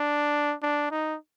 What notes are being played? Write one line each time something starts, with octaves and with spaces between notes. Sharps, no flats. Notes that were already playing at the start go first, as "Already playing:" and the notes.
Already playing: D4
D4
D#4